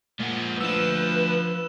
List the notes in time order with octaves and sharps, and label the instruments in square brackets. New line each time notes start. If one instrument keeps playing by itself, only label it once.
[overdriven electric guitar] A#2 F3 [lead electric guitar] G#3 F#5
[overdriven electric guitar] F3 [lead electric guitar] A3 D4 [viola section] B4 [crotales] E6 E7